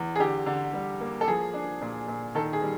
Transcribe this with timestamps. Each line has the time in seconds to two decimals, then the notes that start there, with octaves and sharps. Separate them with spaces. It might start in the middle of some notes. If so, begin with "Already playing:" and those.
Already playing: E2
0.16 G#4
0.20 D3 G4
0.46 D3
0.73 G3
1.00 A#3
1.21 A4
1.28 F3 G#4
1.54 D4
1.81 A#2
2.08 A#2
2.35 D#3 A4
2.53 G#4
2.62 G3